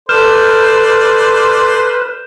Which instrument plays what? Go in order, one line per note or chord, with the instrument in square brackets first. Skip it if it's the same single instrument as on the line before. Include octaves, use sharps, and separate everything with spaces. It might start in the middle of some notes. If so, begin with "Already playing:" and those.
[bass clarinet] A4 [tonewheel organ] B4 [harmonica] C5 D5 [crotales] F6 G6 E7